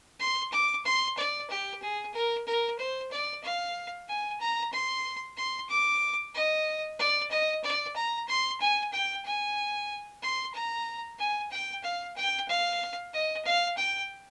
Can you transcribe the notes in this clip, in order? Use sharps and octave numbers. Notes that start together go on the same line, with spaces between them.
C6
D6
C6
D5
G4
G#4
A#4
A#4
C5
D5
F5
G#5
A#5
C6
C6
D6
D#5
D5
D#5
D5
A#5
C6
G#5
G5
G#5
C6
A#5
G#5
G5
F5
G5
F5
D#5
F5
G5